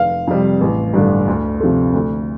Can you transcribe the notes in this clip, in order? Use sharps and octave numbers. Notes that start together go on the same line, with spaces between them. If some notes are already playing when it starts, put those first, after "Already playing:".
Already playing: F1 F5
F2 C3 G3
A1
G2 D3
D2
C3 F3 A3
D2